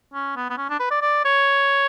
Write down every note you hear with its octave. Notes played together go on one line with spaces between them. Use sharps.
C#4
B3
B3
C#4
D4
B4
D5
D5
C#5